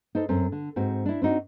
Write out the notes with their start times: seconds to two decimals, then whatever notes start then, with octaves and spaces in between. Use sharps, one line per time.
0.15 D#4 A4 C5
0.29 F#2 C4
0.52 D3
0.76 G#2 C4 F#4
1.06 D4 E4
1.22 C4 D4 D#4 F#4